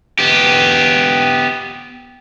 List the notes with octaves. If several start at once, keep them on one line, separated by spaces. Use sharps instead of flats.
B3 G4